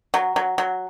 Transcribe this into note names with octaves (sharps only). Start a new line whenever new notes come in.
F#3
F#3
F#3